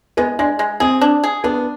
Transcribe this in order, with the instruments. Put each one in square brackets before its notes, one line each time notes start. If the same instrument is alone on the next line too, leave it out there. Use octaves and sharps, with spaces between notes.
[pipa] G#3 [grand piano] B3
[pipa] G#3 [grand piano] D4
[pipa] G#3
[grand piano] C4 [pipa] G#4
[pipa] D4
G#4
[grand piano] B3 [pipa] D4